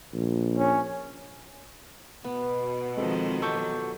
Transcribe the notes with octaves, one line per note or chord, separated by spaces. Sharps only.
A#1
C#4
B2 B3
D#3 F3 G#3 C4 A4 D#5
F#3 G4 A4 C#6 G6